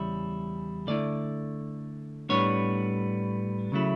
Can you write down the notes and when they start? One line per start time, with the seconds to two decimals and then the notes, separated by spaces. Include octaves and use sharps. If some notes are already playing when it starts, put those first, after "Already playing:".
Already playing: E2 C#3 G3 C#4 E4
0.87 D3 A3 E4 D5
2.29 A2 G3 B3 D4 C#5
3.72 C#3 F#3 A3 E4